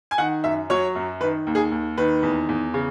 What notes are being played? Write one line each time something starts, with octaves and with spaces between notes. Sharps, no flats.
G#5
D#3 F#5
F#2 E5
F#3 C#5
F#2
D#3 B4
D#2
G#4
D#2
D#3 B4
E2
E2
C#3